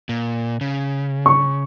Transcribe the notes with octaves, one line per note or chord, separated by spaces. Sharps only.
A#2
C#3
C#6